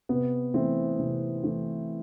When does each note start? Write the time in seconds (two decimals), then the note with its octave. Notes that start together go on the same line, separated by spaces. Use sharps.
0.09 C3 B3
0.54 E3 A3 C4
0.99 C3
1.44 E3 A3